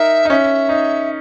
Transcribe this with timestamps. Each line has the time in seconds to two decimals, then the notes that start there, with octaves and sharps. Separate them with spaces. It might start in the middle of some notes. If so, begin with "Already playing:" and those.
Already playing: D#4 A#4 E5
0.25 D#4
0.30 C#4 E5
0.69 D#4